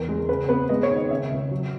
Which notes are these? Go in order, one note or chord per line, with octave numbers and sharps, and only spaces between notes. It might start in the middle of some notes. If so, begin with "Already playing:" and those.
Already playing: E2 A#4
G#3
C#3 B4
B3 B4
G#3 D#5
C#5
D#3
D#5
C#3 E5
C#2
F#3